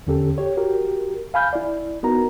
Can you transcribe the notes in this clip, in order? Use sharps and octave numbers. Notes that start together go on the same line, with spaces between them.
E2 D3 C#4 G4 A4
G4 C#5
F#4 G4 A#4
F5 G#5 B5 F6 G6
E4 D5
B3 D#4 F#4 A#4 A#5